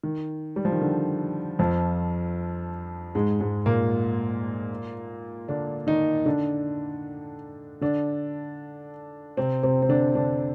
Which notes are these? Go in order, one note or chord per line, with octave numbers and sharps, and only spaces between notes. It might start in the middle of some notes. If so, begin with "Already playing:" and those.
D#3
G3
F3
D#3
D3
F2 F3
G#2 G#3
G#2 G#3
A#2 A#3
D3 D4
D#3 D#4
D3 D4
D3 D4
C3 C4
C3 C4
C4
D3 D4
D3 D4